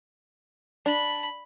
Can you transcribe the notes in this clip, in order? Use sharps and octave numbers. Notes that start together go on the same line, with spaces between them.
D4 B5